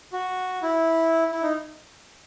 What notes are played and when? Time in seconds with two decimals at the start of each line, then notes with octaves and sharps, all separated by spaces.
0.13 F#4
0.63 E4
1.32 E4
1.43 D#4